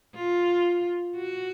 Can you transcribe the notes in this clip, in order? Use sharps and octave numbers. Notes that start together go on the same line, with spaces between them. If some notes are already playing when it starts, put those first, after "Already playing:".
F4
F#4